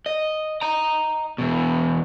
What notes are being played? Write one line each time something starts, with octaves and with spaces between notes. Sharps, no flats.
D#5
D#5 A#5
E2 B2